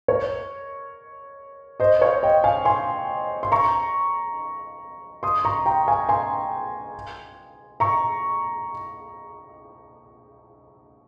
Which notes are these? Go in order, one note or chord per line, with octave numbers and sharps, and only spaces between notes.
A#4 C#5
C5 D#5
C#5 F5
D#5 G5
F5 G#5
G#5 C6
C6
A#5 C#6
C6 D#6
A#5 C#6
G5 A#5
F5 G#5
G#5 C6
A#5 C#6